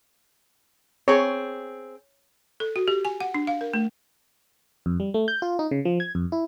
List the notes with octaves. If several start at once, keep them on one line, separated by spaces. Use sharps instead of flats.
C4 G#4 C#5
A4
F#4
G4
G#5
F#5
D4
F5
A#4
A3
F2
G3
A3
G6
F4
D#4
C#3
F3
G#6
F2
E4